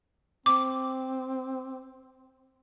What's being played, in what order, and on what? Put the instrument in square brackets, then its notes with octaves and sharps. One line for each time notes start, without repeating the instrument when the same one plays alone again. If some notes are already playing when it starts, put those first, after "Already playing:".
[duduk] C4 [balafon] D6